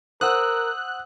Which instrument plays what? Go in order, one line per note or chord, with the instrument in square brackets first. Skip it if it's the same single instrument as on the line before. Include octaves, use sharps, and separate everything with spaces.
[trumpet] A#4 [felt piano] C5 F#5 [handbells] D#6 E6 [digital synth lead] F#6